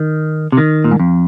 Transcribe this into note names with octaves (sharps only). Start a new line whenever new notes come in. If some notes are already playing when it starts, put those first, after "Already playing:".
Already playing: D#3
C3
D#3
A#2
G#2
F2